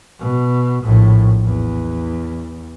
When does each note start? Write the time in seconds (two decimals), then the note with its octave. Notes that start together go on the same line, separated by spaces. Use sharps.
0.20 B2
0.83 A#1 A2
1.45 E2